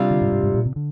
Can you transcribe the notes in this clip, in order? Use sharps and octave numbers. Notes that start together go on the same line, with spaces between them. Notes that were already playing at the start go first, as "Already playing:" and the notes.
Already playing: C3 G3 D4 F4
D3
G#2
G#2
G#2
A#2
C3
D3